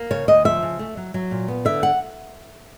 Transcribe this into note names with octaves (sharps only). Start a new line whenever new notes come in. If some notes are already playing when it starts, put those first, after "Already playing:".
Already playing: A#3
C#3 C#5
D2 D#5
F3 E5
C#3
A3
F#3
F#3
A#2
B3
D3 E5
F#5